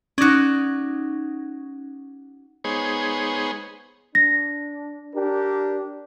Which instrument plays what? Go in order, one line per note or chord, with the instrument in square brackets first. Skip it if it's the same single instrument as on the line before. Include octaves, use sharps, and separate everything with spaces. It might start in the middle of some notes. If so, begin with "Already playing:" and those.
[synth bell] C#4 D#4 [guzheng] F#4 D5
[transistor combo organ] G#3 B3 D#4 G#4 C5 C#5
[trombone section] D4 [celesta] A#6
[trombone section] D4 G4 A#4